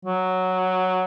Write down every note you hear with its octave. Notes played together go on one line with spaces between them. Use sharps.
F#3